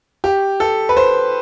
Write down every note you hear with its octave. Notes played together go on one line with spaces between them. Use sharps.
G4
A4
B4
C5